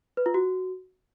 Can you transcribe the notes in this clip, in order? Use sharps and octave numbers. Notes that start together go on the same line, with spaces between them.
B4
F4
F#4